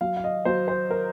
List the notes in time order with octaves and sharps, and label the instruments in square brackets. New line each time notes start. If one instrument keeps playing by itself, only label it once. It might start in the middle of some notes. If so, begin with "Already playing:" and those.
[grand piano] F#3 F5
F5
D#5
F#3 C5
C5
A#4